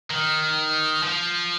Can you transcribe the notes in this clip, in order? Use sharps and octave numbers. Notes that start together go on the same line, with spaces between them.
D#3
F3